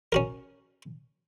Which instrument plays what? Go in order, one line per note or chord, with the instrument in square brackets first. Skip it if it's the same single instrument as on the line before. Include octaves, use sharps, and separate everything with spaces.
[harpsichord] C#4 F#4 A#4